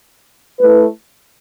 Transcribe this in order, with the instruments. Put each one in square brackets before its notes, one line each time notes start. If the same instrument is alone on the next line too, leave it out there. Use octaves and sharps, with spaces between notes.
[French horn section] A3 E4 B4